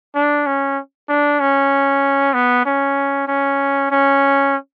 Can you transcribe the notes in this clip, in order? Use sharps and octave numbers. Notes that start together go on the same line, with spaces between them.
D4
C#4
D4
C#4
B3
C#4
C#4
C#4